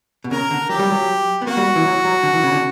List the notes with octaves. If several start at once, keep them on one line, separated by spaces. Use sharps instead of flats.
B2
C#3 A#4
D3
F#3 G4
G3
F#3
B3
A#3 F#4
G3
E3
F#3
F#3
D3
E3
C#3
D3